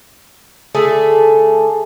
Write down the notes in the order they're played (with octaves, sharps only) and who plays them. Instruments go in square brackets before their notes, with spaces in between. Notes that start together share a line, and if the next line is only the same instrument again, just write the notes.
[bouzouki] D3 A3 G#4 A4